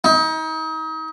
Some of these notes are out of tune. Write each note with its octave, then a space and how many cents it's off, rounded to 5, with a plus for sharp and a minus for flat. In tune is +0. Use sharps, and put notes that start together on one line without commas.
D#4 +35